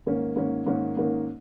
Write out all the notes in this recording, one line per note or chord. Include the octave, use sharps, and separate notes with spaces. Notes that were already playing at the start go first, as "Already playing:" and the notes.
G#2 D#3 A#3 C#4
G#2 D#3 A#3 C#4
G#2 D#3 A#3 C#4
G#2 D#3 A#3 C#4